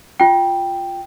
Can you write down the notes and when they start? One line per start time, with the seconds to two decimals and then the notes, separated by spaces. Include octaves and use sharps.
0.20 F4 G5